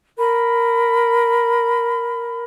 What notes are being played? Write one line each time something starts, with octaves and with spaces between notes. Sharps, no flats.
A#4 B5